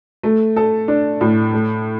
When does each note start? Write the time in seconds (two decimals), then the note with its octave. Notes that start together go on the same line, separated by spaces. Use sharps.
0.23 A3
0.56 A4
0.88 D4
1.21 A2
1.53 A3